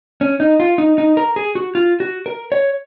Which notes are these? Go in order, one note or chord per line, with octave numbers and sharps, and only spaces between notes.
C#4
D#4
F4
D#4
D#4
A#4
G#4
F#4
F4
F#4
A#4
C#5